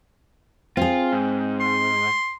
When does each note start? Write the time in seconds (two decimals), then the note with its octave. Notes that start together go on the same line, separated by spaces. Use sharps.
0.77 C4 F4 G#4
1.13 G#2
1.60 C6